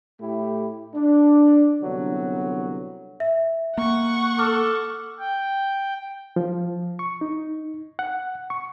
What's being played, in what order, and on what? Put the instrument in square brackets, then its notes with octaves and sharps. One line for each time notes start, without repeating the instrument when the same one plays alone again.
[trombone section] A2 A3 E4 G4
D4
C2 D3 F#3 B3
[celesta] E5
[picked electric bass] A#3 [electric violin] F#5 C#6
[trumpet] A4 [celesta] D6 F6
[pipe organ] G5
[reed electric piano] F3
C#6
D#4
F#5
C#6